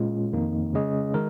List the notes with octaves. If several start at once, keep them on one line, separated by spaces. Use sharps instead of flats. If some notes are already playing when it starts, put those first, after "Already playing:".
Already playing: A#2 G#3 C#4 F4
F2 D#3 A#3 D#4
C#3 G#3 C#4 G#4 D#5
D#3 G#3 A#4